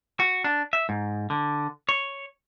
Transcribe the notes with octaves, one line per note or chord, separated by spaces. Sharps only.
F#4
D4
E5
G#2
D3
C#5